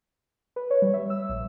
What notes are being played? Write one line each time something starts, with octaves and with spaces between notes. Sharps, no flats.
B4
C#5
G3
E5
E6
A#1